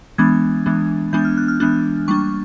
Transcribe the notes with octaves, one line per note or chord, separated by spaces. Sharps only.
E3 G#3 B3 D4 G#6
E3 G#3 B3 D4
E3 G#3 B3 D4 G6
F6
F#6
F6
E3 G#3 B3 D4 F#6
G3 A#3 D4 C#6